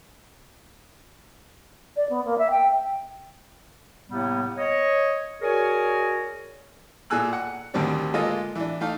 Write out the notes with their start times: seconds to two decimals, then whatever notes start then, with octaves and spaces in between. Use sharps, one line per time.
1.96 D5
2.09 B3
2.24 A#3
2.38 E5
2.50 G5
4.10 A2 C3 G3 A#3 B3
4.58 C#5 D#5
5.41 F#4 G#4 A#4 C#5 D5 G#5
7.10 A#2 G#4 A4 G#5 E6 F#6
7.33 F#5
7.74 D2 D3 D#3 G3 C4 D4
8.14 G#3 A#3 F4 A4 D#5 G#5
8.56 E3 D4
8.80 A3 D#4 F5